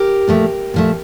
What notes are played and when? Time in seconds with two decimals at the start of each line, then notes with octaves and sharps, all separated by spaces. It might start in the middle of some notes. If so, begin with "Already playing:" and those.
Already playing: G4 A#4
0.28 A#2 F3 A3
0.74 A#2 F3 A3